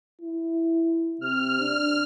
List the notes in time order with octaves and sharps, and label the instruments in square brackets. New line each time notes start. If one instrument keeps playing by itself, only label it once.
[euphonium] E4
[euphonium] C3 [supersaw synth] F6
[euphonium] D4